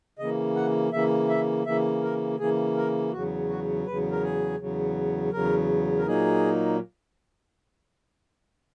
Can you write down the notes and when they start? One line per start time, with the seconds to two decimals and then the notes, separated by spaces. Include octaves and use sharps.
0.19 C#3 E3 A#3 D#5
0.55 F#5
0.92 C#3 E3 A#3 E5
1.29 E5
1.66 C#3 E3 A#3 E5
2.03 A#4
2.39 C#3 E3 A#3 G#4
2.77 A#4
3.12 E2 C#3 F#3 F#4
3.49 F#4
3.87 E2 C#3 F#3 B4
4.12 A#4
4.23 G#4
4.59 E2 C#3 F#3
5.32 E2 C#3 F#3 A#4
5.99 A#4
6.06 A#2 F#3 A#3 D#4 G#4